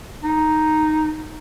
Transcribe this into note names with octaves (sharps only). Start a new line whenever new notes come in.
D#4